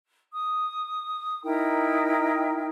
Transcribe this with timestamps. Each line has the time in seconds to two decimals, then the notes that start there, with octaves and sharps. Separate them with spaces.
0.32 D#6
1.44 D#4 E4 A#4 G5